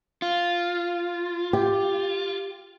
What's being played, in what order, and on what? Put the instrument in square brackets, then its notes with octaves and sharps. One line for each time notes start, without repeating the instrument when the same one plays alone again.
[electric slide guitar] F4
[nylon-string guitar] G4